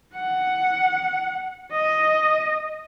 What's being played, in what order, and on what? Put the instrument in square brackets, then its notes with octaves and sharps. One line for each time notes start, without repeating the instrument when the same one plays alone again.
[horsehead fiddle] F#5
D#5